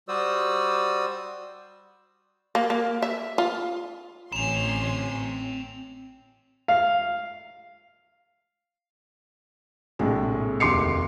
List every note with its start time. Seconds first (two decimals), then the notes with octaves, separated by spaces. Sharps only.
0.08 G3 F#4 C5 D5 D#6 E6
2.55 A#3
2.70 A#3
3.02 E5
3.38 F4
4.33 A1 C4 C#4 A#5 C6 E7 F7
6.68 F5
9.99 A#1 A2 C3 G#3
10.60 F1 D#2 C6 D6 C7 C#7